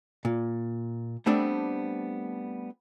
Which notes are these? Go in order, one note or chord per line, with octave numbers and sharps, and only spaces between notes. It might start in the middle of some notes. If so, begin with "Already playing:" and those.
A#2
G3 A3 B3 C4 D4